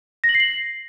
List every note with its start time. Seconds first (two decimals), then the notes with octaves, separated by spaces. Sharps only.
0.24 A#6
0.29 F#7
0.35 C7
0.40 F#7